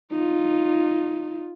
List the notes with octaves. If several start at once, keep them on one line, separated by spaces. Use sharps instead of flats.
D#4 F4